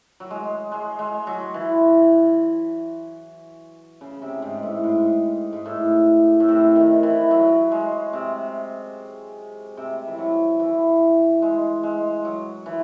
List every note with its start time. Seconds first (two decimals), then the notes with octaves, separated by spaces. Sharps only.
0.20 F#3
0.31 G#3
0.72 G#3
0.99 G#3
1.27 F#3
1.54 E3
4.01 C#3
4.22 C3
4.42 G#2
4.63 A2
4.84 G#2
5.53 G#2
5.66 A2
6.40 A2
6.48 C3
6.76 D#3
7.03 E3
7.31 F#3
7.72 G#3
8.13 C3
9.77 C3
10.07 E3
10.18 F#3
10.59 E3
11.42 G#3
11.83 G#3
12.25 F#3
12.66 E3